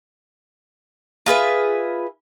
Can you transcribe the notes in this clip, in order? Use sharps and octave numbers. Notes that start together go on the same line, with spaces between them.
F4 G#4 B4 E5